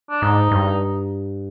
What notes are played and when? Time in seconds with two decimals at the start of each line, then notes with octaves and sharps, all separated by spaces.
0.10 D4
0.22 G#2 D#4
0.51 G2